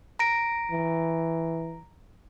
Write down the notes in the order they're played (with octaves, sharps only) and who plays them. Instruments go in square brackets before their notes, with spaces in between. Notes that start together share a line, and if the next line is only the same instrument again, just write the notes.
[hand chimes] A#5 A#6 D7
[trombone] E3